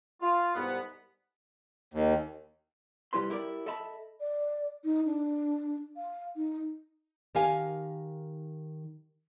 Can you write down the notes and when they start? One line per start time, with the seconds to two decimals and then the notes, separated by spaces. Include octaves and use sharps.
0.21 F4
0.55 C2 G#2 B3
1.94 D#2
3.13 C2 G3 E4 B4 C6
3.30 E4 G4 A#4 D5
3.66 A4 D#5 E5 A5 B5
4.21 D5
4.84 D#4
5.06 D4
5.97 F5
6.36 D#4
7.35 D#3 G4 A#4 F5 G#5